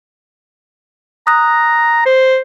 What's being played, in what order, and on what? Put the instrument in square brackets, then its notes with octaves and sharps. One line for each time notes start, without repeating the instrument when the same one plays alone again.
[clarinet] A#5 [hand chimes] D#6 F#6 A#6
[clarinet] C5